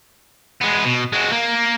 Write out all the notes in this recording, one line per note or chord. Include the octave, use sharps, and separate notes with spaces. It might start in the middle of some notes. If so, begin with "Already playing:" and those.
G#3 B3
B2
G#3 F#4
A#3